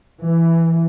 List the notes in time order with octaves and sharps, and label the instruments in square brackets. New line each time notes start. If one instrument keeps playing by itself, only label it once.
[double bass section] E3